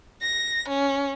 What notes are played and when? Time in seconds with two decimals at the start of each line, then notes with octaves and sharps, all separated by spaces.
0.22 A#6
0.69 C#4